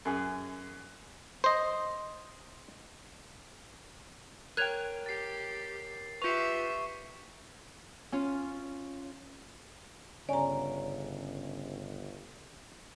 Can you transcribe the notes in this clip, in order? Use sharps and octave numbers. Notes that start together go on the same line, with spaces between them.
F#2 G#4
C5 D#5
A#4 C#5 G5 F#6 G#6 F7
G4 A6 C7
F4 G4 B4 E5 C#6 C#7 F7
C#4 F4
G1 C#3 C#4 D5 A#5